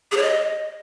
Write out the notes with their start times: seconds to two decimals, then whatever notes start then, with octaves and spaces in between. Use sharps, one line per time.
0.12 G#4
0.17 C#5
0.22 D#5